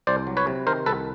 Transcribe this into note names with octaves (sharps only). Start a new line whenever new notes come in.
C2 C5 D5
F#3
B4 C#5
C3
D#3 A#4 C5
C2 A4 B4